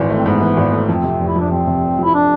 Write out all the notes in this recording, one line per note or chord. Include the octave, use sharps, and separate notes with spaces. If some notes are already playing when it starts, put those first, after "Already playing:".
Already playing: G#1 G#2 E3
A3
C4
G#2 B3
E3
G#1
A3
F2 C4
C3
F1
E4
F3 D4
F2 C4
C3
F1
F3
E4
D4